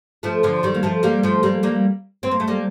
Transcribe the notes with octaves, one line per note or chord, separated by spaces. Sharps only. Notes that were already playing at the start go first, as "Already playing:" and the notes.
F3 A3
D3 F3
D#3 G3
A#3
F3 A3
G3 A#3
F3 A3
G3 A#3
G3 A#3
C4
A#3
A3
G3 A#3